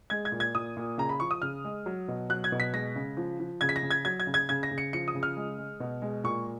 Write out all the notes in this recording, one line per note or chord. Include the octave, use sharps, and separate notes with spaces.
G#3 G#6
G#6
A#2
G#6
A#2 D#6
A#2
C#3 A#5
B5
F3 C#6
D#6
C#3 F6
G#3
F#3
B2
F#3 F#6
G#6
B2
B6
G#3 A#6
C#3
F3
F3
C#3 G#6
B6
A#6
C#3
G#6
F#3 G#6
G#6
C#3
G#6
C#3 G#6
A#6
C#3
C#7
F3 C#7
D#6
C#3
F6
G#3
G#3
B2
G#3
A#2 C#6